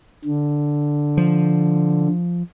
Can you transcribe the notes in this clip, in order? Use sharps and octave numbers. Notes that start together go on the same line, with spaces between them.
D3
F3